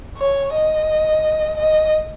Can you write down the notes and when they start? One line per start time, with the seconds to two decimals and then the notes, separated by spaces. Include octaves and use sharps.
0.18 C#5
0.52 D#5
1.57 D#5